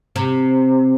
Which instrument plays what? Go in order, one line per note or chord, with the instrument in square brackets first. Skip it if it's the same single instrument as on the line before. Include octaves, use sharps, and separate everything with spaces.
[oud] C3